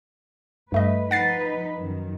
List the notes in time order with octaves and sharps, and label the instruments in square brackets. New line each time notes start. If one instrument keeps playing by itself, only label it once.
[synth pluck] G2 A3 D#5 [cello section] B4
[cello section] F3 D#4 B4 [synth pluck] F#5 A6 C7
[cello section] F#2 D#3